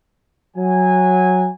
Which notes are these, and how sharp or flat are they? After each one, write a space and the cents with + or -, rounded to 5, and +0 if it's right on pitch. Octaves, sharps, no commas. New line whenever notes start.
F#3 -10 G#5 -15